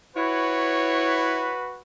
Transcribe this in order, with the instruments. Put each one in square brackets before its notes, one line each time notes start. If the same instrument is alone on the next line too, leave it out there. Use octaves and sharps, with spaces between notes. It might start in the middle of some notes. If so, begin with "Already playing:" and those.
[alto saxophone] E4 [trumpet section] F#4 B4 [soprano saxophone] C#5